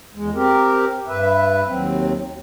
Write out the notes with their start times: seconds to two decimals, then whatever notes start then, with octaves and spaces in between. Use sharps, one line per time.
0.15 E2 G#3
0.35 C4 G4 A#4
1.08 G2 B4 E5
1.66 D#2 F#3 C4